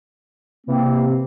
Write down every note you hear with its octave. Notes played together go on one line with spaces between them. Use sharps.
C3 E3 A#3 C4